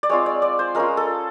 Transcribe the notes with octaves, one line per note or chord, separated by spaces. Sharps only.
D5
G#3 C4 F4 C#5
D5
D5
C5
G#3 C#4 F4 A#4
A4